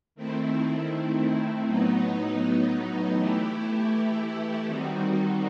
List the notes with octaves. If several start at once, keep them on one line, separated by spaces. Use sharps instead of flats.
D#3 A3 C4 E4
A2 F#3 B3 D#4
E3 A3 E4 G4
D#3 G3 C4 D#4 F#4